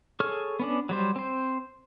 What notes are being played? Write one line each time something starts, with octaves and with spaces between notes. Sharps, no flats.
G#4 A4 C#5 C#6 F6
B3 C#4 D4
F#3 G3 C5
C4 C5